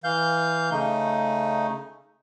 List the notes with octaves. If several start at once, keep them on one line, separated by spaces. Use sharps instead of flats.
E3 F5 G6
C#3 A3 D#4